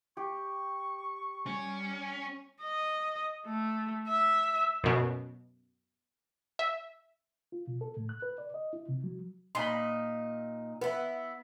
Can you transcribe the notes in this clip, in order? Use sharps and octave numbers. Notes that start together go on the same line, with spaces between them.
G4 C#6
G3 C#4
D#5
A3
E5
F#2 B2
E5
F4
B2
A4
A2
F#6
B4
D5
D#5
E4
C3
F#3
A#2 D#4 B5 C6
B3 E4 B4